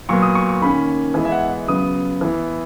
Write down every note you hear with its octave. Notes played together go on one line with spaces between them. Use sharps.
A#2 F#3 B3 C#6
D#6
C#6
C#6
D#3 A#3 C#4 B5
E3 G#3 B3 G#5
E5
F#5
E5
C#3 F#3 B3 D#6
E3 B3